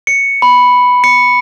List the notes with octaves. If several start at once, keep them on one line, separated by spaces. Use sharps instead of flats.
C#7
B5
C#7